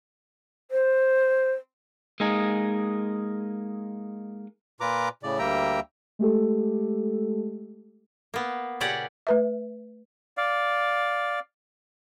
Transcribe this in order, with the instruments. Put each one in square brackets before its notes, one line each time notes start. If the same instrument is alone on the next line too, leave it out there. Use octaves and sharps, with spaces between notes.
[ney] C5
[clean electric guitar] G#3 A#3 D#4 G#4
[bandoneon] A#2 F4 B4 A#5 D6
A2 C#3 D5
D2 G3 A#3 E5 G5 A#5
[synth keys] G#3 A3 G4 A4
[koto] A#3 B3
A#2 C#3 C#4 G4 D5 F#5
[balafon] A3 B4 E5
[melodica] D5 F5